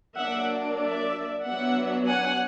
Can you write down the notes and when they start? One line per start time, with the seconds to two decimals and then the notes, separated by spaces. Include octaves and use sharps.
0.17 F#3 A#3 D4 E5 F#5
0.81 D5 E5
1.45 F#3 B3 D4 E5 F#5
2.08 F#5 G#5